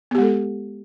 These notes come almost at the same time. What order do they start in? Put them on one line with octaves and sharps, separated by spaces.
B3 G4 G#3 A4